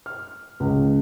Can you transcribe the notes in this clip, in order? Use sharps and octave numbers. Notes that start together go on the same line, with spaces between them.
F6
C#2